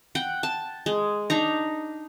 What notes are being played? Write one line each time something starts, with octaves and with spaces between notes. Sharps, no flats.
F#5 G5
A5
G#3
D4 D#4 A#5